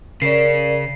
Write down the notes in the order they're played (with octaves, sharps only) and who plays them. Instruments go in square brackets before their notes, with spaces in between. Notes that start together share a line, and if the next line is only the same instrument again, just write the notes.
[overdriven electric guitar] C#3 C#4 [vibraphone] A#4 D5 [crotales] C7